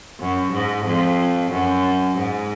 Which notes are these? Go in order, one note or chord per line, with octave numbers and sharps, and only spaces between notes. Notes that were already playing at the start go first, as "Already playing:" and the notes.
F#2
G#2
F2
F#2
G#2